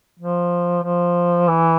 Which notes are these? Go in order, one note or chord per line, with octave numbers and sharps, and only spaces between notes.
F3
F3
E3